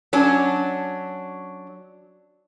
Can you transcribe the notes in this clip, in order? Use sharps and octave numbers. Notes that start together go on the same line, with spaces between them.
F#3 C#4 D4